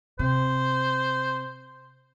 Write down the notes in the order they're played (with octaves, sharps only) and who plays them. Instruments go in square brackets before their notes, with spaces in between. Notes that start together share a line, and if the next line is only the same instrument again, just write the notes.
[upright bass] C3 [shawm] C5